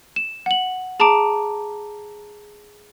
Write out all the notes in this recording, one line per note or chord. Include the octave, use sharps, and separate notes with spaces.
E7
F#5 F#7
G#4 A5 A#5 D6 D7